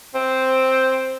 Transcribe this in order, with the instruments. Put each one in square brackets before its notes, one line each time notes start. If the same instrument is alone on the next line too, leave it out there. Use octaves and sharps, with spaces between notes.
[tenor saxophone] C4